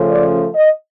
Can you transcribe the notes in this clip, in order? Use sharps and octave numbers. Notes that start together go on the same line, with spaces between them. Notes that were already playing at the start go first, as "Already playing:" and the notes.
Already playing: C#3 F3 A3 C#4
D5
D#5